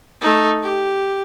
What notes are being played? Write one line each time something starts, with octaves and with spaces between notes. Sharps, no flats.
A3 D#4
G4